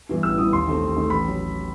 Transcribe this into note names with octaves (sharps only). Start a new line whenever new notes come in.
G2 E3 B3 E4
A1 E6
G2 E3 B3 E4 D#6
D#2 C6
D#3 A3 C4
D#2
D#3 A3 C4
A1 B5
F#3